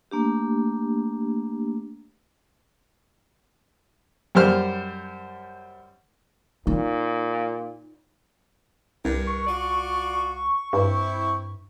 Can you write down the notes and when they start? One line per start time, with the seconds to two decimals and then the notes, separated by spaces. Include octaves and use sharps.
0.11 A3 A#3 D4 G4
4.35 F#2 G3 C5 F6
6.67 A#2 D#4
9.05 C2 G2 D4 A#4
9.27 C#6
9.47 F4 F#4 D5
10.73 G2 C4 E4